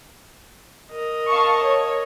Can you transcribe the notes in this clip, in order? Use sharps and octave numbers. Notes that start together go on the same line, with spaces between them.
A#4 D#5
F5 A5 C#6
C#5